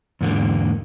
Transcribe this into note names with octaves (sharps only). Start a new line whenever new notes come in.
E2 G#2 D3 A#3